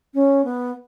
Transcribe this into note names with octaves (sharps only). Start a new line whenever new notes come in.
C#4
B3